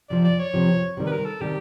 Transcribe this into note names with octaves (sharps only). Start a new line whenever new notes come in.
F2 C3 F3 D5
D5
C#5
F2 C3 F3
C3 D#3 G3
B4
A#4
A4
C3 D#3 G3 G4